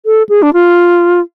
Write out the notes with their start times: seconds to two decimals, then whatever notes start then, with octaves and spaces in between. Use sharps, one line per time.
0.06 A4
0.29 G#4
0.42 D4
0.53 F4